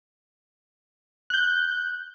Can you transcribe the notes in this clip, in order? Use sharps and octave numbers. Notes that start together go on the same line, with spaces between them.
F#6 G6